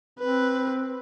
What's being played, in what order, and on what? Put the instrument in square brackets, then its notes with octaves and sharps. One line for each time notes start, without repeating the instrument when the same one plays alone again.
[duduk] C4 [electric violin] B4